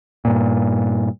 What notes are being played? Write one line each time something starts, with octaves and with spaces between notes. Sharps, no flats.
G2 A#2